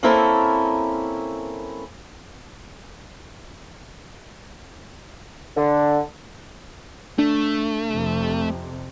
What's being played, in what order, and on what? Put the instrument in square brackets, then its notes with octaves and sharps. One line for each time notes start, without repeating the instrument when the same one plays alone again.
[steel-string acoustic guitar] A#3 C4 C#4 E4 A4 A#4
[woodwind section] D3
[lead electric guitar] A3 [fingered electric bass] D4
[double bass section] F2 C3